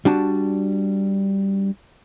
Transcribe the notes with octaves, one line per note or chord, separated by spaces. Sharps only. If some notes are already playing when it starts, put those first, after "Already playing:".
G3 D4 F#4 A5